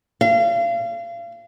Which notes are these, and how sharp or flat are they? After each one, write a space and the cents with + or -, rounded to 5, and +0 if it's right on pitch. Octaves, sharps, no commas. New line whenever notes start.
F5 -35